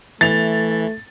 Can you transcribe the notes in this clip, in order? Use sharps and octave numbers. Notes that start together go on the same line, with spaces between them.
E3 A3 A6 F7